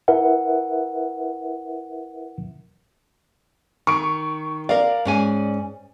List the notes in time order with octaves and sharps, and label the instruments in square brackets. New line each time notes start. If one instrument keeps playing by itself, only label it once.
[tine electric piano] E4 A#4 B4 E5 F#5
[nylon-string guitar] D#3 [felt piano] C#6 D7
[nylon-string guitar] A#4 F5 [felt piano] D5
[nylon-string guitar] G#2 C#4 G#5